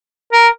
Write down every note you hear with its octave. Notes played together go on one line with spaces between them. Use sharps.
A#4